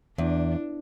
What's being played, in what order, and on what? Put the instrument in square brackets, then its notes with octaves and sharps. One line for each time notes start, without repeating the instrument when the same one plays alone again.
[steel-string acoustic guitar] E2 [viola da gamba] D4